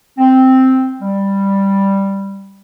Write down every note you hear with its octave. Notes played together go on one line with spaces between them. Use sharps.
C4
G3